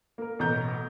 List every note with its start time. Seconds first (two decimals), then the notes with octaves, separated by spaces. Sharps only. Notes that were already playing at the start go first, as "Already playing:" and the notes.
0.18 A#3 A#4
0.39 A1 B2 A3 A#5 G6